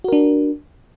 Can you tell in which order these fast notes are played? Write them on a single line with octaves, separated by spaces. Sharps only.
F#4 A#4 D4